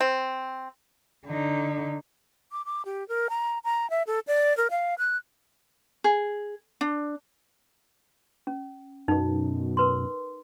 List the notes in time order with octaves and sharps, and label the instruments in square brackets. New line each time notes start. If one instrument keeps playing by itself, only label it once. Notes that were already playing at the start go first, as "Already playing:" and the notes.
[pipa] C4
[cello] D3 D#4
[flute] D6
D6
G4
A#4
A#5
A#5
E5
A4
D5
A#4
F5
F#6
[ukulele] G#4
D4
[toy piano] C#4
[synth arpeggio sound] F#2 B2 [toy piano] D#4
[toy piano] A#4 B4 C6